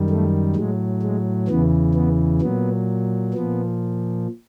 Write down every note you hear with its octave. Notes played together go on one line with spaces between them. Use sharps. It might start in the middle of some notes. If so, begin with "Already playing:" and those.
Already playing: F#2 D#3 G3
A3
A2 F#3 G#3
G#3
E2 C#3 E3 B3
B3
A#2 F#3 B3
A#2 F3 B3